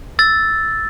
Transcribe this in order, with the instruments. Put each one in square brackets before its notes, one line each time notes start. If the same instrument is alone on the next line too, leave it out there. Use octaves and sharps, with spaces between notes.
[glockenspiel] E6 A6